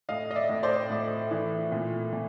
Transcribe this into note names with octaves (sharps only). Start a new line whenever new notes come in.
A2 D#5 F5
D#5
D5 E5
A2
C5 D5
A2
E3
A#2
A#2